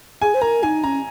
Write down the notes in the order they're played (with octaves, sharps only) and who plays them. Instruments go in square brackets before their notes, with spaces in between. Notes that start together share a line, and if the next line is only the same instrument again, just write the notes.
[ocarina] G#4 [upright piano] G#5
[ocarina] C5
[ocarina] A#4 [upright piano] A#5
[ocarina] D#4 [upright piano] G#5
[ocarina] C#4 [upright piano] A#5